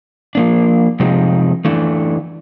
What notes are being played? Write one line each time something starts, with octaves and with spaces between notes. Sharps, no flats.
F3 A#3 D4
C3 F3 G#3 C4 D#4
E3 A3 D4